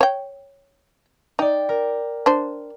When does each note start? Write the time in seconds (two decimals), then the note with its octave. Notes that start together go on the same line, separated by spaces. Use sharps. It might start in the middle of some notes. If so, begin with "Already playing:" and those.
0.01 C#5 G5
1.39 D#4 D5 G5
1.69 A#4
2.26 D4 C5